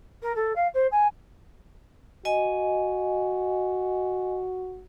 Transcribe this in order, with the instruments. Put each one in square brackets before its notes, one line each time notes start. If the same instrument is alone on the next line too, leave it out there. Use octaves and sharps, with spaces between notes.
[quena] A#4
A4
F5
C5
G#5
[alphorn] F#4 [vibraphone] D#5 G#5